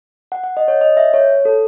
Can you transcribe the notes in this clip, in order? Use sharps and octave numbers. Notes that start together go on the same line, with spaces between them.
F#5
F#5
D#5
C#5
D#5
E5
C#5
A4